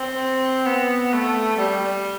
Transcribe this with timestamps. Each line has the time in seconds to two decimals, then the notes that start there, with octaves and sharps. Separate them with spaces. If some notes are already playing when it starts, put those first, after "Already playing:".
Already playing: C4
0.65 B3
1.13 A3
1.58 G3